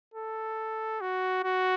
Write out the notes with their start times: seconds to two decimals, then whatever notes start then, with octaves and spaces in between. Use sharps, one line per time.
0.14 A4
1.01 F#4
1.44 F#4